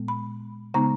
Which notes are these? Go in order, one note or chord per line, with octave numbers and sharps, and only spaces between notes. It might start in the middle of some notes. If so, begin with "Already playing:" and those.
Already playing: A#2 G#3 B3
B5
C#3 G#3 B3 D#4 A#5